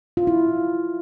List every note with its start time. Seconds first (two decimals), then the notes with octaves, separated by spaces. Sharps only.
0.17 F4
0.27 E4